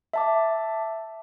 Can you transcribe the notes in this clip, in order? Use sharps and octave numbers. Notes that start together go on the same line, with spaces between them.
E5 A5 D6